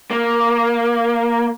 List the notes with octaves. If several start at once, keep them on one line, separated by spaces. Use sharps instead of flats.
A#3